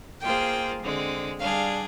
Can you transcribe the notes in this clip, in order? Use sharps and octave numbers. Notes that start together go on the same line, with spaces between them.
A#3 F4 G#4 C5 G5
D3 G#3 C4
G3 D4 G#4 F5